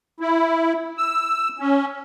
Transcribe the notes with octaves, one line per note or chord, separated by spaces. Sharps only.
E4
E6
C#4